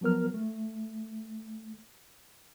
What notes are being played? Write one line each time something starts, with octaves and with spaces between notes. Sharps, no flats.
F3 F#3 B3 A#4 F6
A3